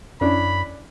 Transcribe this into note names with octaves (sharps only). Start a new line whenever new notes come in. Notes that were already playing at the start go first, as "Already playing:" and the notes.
F#2 C#4 D4 E4 B5